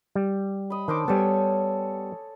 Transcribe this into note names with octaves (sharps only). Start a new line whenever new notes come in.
G3
D#5 B5
D#3 D4 C5 D6
G3 B3 A4 C#5 G#5